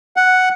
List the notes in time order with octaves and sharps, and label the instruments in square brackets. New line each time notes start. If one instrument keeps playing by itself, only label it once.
[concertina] F#5